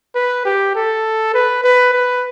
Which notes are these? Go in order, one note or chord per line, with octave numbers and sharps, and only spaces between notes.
B4
G4
A4
B4
B4
B4